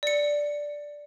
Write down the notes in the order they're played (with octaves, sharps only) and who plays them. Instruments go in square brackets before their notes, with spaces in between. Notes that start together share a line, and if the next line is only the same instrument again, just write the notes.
[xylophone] D5 C#7